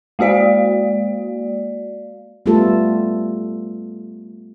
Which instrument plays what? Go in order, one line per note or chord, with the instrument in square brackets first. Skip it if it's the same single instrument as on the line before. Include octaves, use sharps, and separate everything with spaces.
[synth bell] G#3 A#3 F#4 D5 F5
[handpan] G3 A3 B3 F4 A4